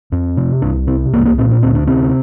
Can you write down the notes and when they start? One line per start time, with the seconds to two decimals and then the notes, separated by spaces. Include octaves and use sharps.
0.12 F2
0.37 C3
0.62 C2 D4
0.87 C3 C4
1.13 C2 A#3
1.21 A3
1.25 A#3
1.38 A#2 C4
1.51 D4
1.63 D2 C4
1.75 D4
1.87 C3 C4